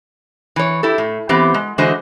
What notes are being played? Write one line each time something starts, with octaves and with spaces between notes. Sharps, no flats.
E3 C#5
E4 G4 A4
A2
E3 B3 C4 G4
G#3
D3 E3 G#3 F#4 C5 D#5